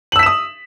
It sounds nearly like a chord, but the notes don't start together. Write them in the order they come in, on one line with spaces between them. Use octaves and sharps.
F#7 E6 B6 E7 D#6